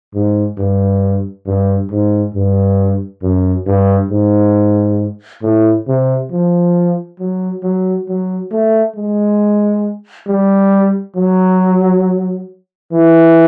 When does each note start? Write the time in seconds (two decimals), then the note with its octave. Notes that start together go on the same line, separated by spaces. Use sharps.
0.14 G#2
0.58 G2
1.47 G2
1.91 G#2
2.34 G2
3.22 F#2
3.67 G2
4.11 G#2
5.43 A2
5.88 C3
6.32 F3
7.20 F#3
7.63 F#3
8.08 F#3
8.52 A3
8.96 G#3
10.28 G3
11.16 F#3
12.92 E3